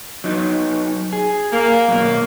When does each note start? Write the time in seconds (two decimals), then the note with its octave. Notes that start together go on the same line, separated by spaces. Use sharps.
0.24 F#3 D#4
1.13 G#4
1.53 A#3
1.88 F#2 B2